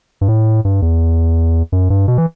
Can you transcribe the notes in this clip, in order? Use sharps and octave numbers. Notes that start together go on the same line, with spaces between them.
G2
A2
G2
E2
F#2
G2
B2
E3